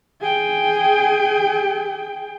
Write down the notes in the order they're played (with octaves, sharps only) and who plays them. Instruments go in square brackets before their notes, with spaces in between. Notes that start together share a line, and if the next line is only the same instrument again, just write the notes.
[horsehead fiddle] G#4 G5